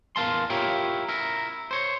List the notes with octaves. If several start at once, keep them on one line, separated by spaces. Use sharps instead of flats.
E2 A#4 F5 A5 C6
E4 F4 G4 A#4 C#5
E4 A#4
C5 C#5